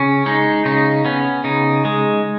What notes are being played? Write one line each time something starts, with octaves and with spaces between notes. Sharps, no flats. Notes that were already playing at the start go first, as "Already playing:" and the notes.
Already playing: C#3 C#4
G#3 D#4
C#3 D#4
B3 C#4
C#3 D#4
G#3